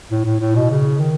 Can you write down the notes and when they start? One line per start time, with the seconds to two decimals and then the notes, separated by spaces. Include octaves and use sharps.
0.11 A2
0.25 A2
0.40 A2
0.55 B2
0.70 C#3
1.00 D#3